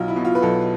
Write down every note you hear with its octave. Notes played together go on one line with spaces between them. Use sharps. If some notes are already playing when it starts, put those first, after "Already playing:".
Already playing: B1 F4
E4
B2
F4
B4
B1 A4